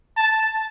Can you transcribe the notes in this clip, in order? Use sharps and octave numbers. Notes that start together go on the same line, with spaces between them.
A5